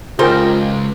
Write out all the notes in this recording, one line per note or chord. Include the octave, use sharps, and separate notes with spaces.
C#2 G3 D#4 F4 G#4 A#4 C5 G5